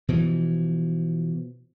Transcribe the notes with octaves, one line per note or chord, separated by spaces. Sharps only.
B2 E3 F3